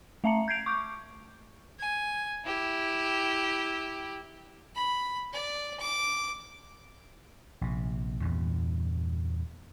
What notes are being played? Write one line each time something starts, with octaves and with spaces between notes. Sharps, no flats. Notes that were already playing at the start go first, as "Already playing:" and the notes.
A3 E5 A5 A#5 C#7
G6 G#6 C7 D7 F7
C#6 D6 G6
G#5
E4 G4
B5
D5
D6
A#1 C3
E2 G2 A#2